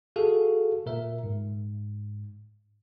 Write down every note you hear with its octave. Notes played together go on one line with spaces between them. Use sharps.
F#4 G#4 A4 F5
A#2 A#4 E5
G#2